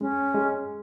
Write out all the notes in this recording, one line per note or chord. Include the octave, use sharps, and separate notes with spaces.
G#3 C#4
G#3